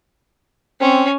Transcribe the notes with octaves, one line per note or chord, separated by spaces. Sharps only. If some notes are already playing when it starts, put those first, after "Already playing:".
C4 C#4